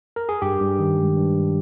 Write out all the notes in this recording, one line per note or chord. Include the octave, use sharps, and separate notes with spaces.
A#4
G#4
G2 G4
G2
D#3
G#3
G2
G2